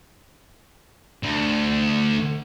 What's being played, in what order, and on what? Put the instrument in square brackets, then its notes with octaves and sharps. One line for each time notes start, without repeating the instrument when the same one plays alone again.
[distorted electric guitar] D2